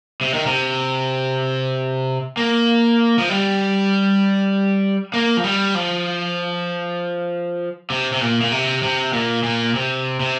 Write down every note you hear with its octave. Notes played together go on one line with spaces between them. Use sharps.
C3
D#3
C3
A#3
F3
G3
A#3
F3
G3
F3
C3
C3
A#2
A#2
C3
C3
A#2
A#2
C3
C3